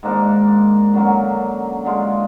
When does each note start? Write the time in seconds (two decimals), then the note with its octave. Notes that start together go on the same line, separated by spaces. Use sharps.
0.03 G#2 D#3 A#3 D4
0.94 F#2 D3 F#3 A#3
1.85 D3 G#3 D4 F4